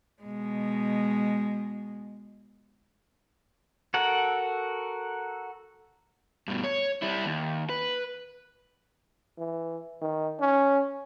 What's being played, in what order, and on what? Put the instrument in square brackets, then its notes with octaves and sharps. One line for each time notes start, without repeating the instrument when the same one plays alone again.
[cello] B2 G#3
[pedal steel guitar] F#4 A4 A#4 F#5
[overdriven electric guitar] G2 B2
C#5
G3 E4
D#2
B4
[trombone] E3
D#3
C#4